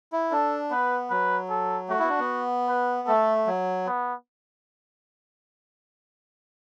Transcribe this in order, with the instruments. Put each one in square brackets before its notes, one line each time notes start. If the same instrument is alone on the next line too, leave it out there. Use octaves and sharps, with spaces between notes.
[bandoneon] E4
[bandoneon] D4 [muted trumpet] A4
[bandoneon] B3 [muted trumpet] B4
[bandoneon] F#3 [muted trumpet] B4
[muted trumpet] A4
[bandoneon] A3 [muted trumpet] F#4
[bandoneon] B3 E4
D4
B3
[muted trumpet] B4
[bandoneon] A3 [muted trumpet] A4
[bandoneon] F#3
[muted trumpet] B3